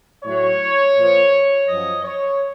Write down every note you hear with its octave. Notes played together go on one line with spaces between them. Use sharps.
A2 F#3 C#5
A#2 F3
F#2 F3 D#5
C#5